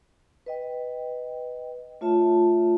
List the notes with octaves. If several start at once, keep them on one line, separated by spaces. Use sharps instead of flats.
B4 D#5 G5
A3 F4 C#5 E5 A5